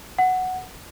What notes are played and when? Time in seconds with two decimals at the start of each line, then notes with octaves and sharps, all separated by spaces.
0.19 F#5